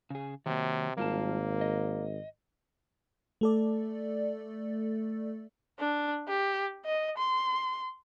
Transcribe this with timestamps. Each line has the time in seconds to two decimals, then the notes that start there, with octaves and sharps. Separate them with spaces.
0.10 C#3 G#4
0.46 C3 D#3 F#3 A#3
0.97 G#1 G3 A#3 F4 A5
1.61 D#5
3.41 A3 A4 D5
5.79 D4
6.28 G4
6.85 D#5
7.18 C6